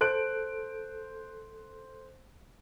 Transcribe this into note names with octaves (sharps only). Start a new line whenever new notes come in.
A4 C5 F#6 D7